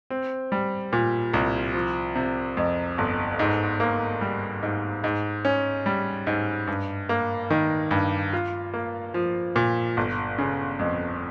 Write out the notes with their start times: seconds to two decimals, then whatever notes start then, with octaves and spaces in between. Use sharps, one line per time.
0.10 C4
0.52 G3
0.93 A#2
1.33 C2
1.74 F3
2.15 C3
2.57 F2
2.98 G1
3.39 G#2
3.80 A#3
4.21 G3
4.63 G#2
5.04 G#2
5.45 C#4
5.86 G3
6.27 G#2
6.67 G2
7.09 A#3
7.50 D#3
7.91 G2
8.33 F4
8.74 A#3
9.14 F3
9.56 A#2
9.97 G1
10.38 C#3
10.79 F2